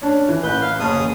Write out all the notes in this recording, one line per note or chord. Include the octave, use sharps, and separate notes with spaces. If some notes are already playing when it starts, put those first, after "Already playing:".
C#4 D4
E3
A1 B4 G6
F5
F#1 C#4 G#4 A5 D#6
F#1 E2